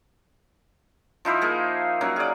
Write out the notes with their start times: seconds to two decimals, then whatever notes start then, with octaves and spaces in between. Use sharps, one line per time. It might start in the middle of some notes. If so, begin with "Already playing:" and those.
1.25 F3 D#4 E4 C5
1.41 A#3 G#4
2.01 F#3 A#3 C#4
2.16 G#4 D5